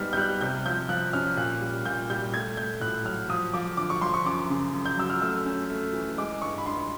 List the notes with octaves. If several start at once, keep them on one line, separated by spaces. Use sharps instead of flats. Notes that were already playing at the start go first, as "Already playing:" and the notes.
Already playing: G#2 G3 B3 F6
G6
G3 F#6
C3 G6
F3 G6
F3 F#6
C#4 F6
A#2 F#6
G3
A#2 G6
G3 G6
A3 G#6
A3 G6
A2 F#6
F#3 F6
F3 D#6
F3 D6
D3 D6
C#6
F3 C6
C#6
F#2 D6
C#3
F#2
G6
F#3 E6
F6
A3 E6
C#4
A3
E3
G#3 D6
G2 C#6
B5
G2 C6